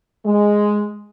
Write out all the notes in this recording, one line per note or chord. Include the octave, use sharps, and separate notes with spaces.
G#3